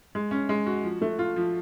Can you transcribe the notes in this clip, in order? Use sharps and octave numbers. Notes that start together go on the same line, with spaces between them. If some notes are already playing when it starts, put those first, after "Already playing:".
G#3
C#4
G#3
F#4
F3
A3
F4
F3